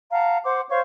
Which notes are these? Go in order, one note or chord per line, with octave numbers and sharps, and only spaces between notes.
F5 F#5 A5 A#5
C5 F#5 C6 D6
C5 C#5 F5 C#6